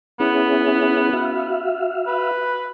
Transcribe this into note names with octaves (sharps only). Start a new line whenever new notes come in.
B3 C#4 E4 G#4
F#4 E5 F5
B4